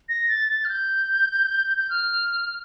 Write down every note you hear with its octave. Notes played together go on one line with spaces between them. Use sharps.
A#6
A6
A6
F6
G6
G6
F6